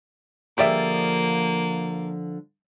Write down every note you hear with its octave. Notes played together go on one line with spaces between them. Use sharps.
D3 F3 A#3 G4 G#4 D5 E5